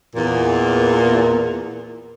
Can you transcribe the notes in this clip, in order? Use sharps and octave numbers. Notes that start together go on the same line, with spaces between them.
E2 A#2